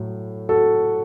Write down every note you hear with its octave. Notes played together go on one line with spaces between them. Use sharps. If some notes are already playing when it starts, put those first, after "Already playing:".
Already playing: A2 F#3
F#4 A4